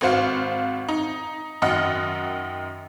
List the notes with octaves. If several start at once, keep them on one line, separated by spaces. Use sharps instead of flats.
G#1 F#4 C5 F5 F#5
D#4
F#2 D#3 D#5 F#5 F6